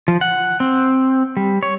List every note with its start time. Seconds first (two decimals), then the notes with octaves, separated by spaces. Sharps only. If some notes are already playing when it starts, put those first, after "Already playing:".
0.08 F3
0.21 F#5
0.60 C4
1.37 G3
1.63 C#5